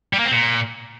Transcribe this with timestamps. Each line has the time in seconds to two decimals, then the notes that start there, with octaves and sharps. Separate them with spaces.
0.13 G3
0.19 A#3
0.25 C4
0.32 A#2